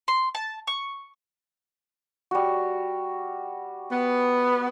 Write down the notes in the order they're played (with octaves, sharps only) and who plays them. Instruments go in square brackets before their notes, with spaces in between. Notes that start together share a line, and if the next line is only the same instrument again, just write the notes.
[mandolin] C6
A5
C#6
[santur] G3 F#4
[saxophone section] B3